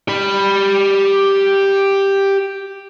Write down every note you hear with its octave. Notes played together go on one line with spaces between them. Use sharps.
G4 B5